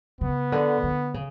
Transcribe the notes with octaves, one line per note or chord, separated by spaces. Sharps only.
C#3 B3
D3
D3
C#3